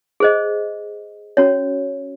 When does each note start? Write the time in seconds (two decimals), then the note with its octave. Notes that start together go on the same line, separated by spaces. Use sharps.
0.20 G#4 C5 D#5
1.37 C#4 F#4 C#5